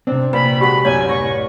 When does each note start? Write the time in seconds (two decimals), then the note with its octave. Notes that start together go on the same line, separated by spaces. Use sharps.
0.07 C3 C4 D4
0.33 A#1 B4 B5
0.61 G#3 F#4 G4 A4 B5
0.85 C2 F#2 C#5 G#5 G#6
1.09 D1 D5 C#6 A#6